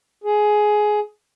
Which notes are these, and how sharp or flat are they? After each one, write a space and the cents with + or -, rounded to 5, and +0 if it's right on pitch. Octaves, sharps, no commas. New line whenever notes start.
G#4 +15